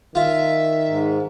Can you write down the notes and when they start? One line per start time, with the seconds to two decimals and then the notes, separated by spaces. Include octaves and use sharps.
0.15 D#3 F4 E5
0.87 G#2